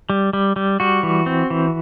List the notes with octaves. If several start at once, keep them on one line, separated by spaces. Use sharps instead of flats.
G3
G3
G3
G3 F#4
E3
C4
E3